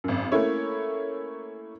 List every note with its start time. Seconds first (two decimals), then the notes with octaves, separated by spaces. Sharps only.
0.04 G#1 F#2
0.32 A3 A#3 C#4 E4 C#5